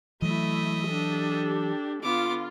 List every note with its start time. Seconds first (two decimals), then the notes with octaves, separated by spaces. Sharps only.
0.22 E3 F#3 A3 E4 D#5 E5
0.87 D4 G4 A4
2.03 D3 B3 F4 D6